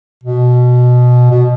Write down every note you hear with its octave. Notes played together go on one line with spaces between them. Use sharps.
B2
B2